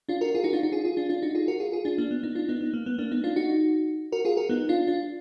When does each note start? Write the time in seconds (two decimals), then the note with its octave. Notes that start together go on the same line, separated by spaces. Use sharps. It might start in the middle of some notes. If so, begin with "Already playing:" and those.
0.09 D4 F4
0.21 F#4 A#4
0.35 F4 G#4
0.44 D#4 F#4
0.53 D4 F4
0.63 D#4 F#4
0.72 F4 G#4
0.85 F4 G#4
0.97 D4 F4
1.09 D4 F4
1.22 D#4 F#4
1.35 F4 G#4
1.48 F#4 A#4
1.60 F4 G#4
1.73 F4 G#4
1.85 D4 F4
1.98 A#3 D4
2.11 B3
2.23 B3 D#4
2.35 D4 F4
2.49 B3 D#4
2.61 B3
2.74 A#3
2.86 B3
2.98 A#3 D4
3.11 B3 D#4
3.24 D4 F4
3.36 D#4 F#4
4.12 F#4 A#4
4.25 F4 G#4
4.37 F#4 A#4
4.49 B3 D#4
4.69 D4 F4
4.87 D4 F4